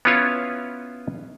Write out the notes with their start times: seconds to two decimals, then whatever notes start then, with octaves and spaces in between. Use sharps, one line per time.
0.05 B3 C#4 E4 F4 B4 C#5